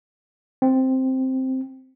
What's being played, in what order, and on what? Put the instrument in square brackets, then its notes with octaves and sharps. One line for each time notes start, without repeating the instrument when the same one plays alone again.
[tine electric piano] C4